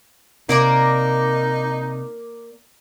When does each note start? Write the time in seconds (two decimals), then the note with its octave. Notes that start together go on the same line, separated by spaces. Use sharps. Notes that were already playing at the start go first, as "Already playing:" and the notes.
0.49 C3 A#3 D#4 A#4 D5